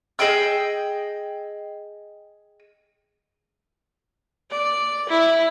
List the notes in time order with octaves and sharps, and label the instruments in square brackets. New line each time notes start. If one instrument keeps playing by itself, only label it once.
[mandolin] G#4 D#5 G5 E6
[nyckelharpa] D5
E4